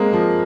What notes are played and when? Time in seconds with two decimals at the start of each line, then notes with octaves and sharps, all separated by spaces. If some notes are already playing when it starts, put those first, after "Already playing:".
Already playing: G#3 A#3 C4
0.13 F3